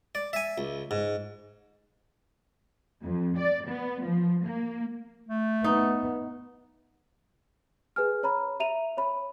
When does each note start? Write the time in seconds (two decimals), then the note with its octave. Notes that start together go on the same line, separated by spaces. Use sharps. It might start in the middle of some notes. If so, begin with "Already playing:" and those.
0.15 D5
0.33 E5 G#5
0.58 C#2
0.91 G#2
3.01 F2
3.37 D5
3.67 B3
4.01 F3
4.43 A#3
5.29 A3
5.64 B3 D#4
7.96 G#4 B4 G#5 F6
8.23 C#5 A#5 B5
8.60 E5 A#5 D#7 F7
8.97 C#5 B5